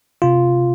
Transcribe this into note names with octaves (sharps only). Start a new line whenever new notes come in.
C3 F4